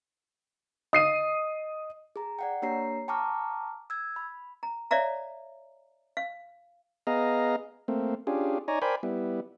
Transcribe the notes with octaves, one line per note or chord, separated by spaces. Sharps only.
D#5 D#6 C7 D#7
G#4 A#5
D5 F#5 G5
A#3 D4 G4 C#5 A#5 C7
G5 A5 A#5 C#6 D6 F6
E6 G#6
B5
A#5
C#5 D5 E5 F5 A#5
F5
B3 G#4 D#5 F5 A#5
A3 A#3 C4
C#4 D4 F4 G4 G#4
D#4 C#5 D5 G#5 A#5
A#4 C5 D5 G5 G#5 B5
G3 B3 E4